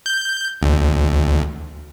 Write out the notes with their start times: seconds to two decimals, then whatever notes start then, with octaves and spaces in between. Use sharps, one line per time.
0.06 G6
0.62 D2